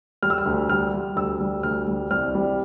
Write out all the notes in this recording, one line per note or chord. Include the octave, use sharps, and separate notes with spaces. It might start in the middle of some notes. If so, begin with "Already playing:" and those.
G3 F6
E6
F6
D2
G3 F6
G3
D2 E6
G3
D2 F6
G3
C2 F6
G3